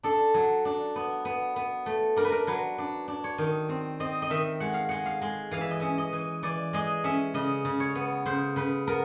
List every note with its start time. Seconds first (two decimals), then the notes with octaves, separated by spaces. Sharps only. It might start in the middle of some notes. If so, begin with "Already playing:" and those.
0.03 D4 A4
0.34 F#3
0.65 D4
0.96 B3
1.25 B3
1.56 B3
1.86 A3
2.16 D4 A#4
2.25 B4
2.32 A#4
2.47 F#3 B4
2.78 D4
3.08 D4
3.24 C#5
3.38 D#3
3.69 C4
4.00 C4 D#5
4.22 D#5
4.30 D#3 E5
4.60 G#3 F#5
4.74 F5
4.89 G#3 F#5
5.06 F5
5.22 G#3
5.51 E3 F5
5.61 E5
5.71 D#5
5.80 C#4 E5
5.98 D#5
6.13 E3
6.43 E3 D5
6.73 G#3 D#5
7.04 C#4 E5
7.34 C#3 D#5
7.65 C#3
7.80 C#5
7.95 B3
8.25 C#3 C5
8.56 C#3 B4
8.87 B3 A#4